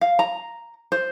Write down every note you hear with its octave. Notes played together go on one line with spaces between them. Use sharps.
F5
A#5
C5